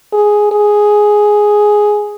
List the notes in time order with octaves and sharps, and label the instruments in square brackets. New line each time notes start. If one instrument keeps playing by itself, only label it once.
[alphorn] G#4
G#4